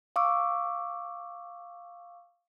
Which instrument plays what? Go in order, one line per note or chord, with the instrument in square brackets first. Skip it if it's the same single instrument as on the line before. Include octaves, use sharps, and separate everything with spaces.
[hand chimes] F5 C#6 D6 E6